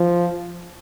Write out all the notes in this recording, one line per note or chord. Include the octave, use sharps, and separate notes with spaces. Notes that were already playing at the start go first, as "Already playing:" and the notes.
Already playing: F3